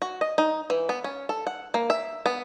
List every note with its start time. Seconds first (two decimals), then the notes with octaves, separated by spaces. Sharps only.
0.02 F#4
0.21 D#5
0.38 D#4
0.70 E3
0.89 B3
1.04 C#4
1.29 A4
1.47 F#5
1.74 A#3
1.90 E5
2.26 B3